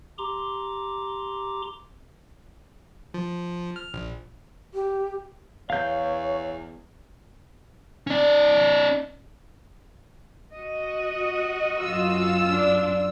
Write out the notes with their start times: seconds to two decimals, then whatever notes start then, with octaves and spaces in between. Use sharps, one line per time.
0.18 G4 A#5 C6 D6
3.14 F3
3.76 F6
3.94 A#1
4.74 G4
5.70 E2 C#5 F5 G6
8.07 C#4 D5
10.53 F#4 D#5
11.81 F#2 F4 E6
12.48 D4